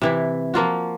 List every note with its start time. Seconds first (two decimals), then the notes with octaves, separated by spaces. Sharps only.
0.02 C3 E3 E4
0.54 F3 A#3 F4 F#4